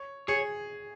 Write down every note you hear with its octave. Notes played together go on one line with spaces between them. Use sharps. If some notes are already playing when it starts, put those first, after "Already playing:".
Already playing: C#5
G#4 C#5